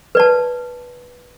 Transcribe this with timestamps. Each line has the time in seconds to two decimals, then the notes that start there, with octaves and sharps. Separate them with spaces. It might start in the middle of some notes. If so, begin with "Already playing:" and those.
0.15 B4 D5 A5